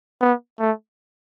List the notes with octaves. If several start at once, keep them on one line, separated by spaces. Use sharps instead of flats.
B3
A3